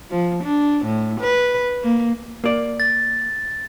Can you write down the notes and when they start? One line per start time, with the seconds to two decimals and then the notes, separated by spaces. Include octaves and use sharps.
0.11 F3
0.43 D4
0.85 A2
1.20 B4
1.83 A#3
2.44 A#3 D5
2.80 A6